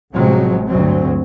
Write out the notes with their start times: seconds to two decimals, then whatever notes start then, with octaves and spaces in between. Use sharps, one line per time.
0.13 A1 C3 F3 F#3 G#3 C4
0.69 D2 G2 F#3 C4